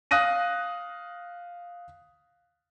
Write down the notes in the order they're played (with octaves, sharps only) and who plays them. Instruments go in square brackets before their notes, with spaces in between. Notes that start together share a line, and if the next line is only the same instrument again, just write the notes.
[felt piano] F5 D#6 F#6 A#6 D#7